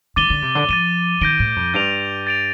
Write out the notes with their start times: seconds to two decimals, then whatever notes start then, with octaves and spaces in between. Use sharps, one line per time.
0.16 D#3 D6 A6 D#7 G7
0.30 D3
0.42 C3
0.55 D3
0.68 F3 A6 D#7 G7
1.21 D#3 G6 A#6 D7 G7
1.39 A2
1.56 F2
1.74 G2 G6 D7 F7
2.27 A6 D7 F7